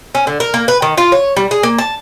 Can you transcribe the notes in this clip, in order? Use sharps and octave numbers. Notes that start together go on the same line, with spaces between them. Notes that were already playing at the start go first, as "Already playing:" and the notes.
C#4
D3
A#4
A#3
B4
D#3
F4
C#5
G3
G#4
A#3
A5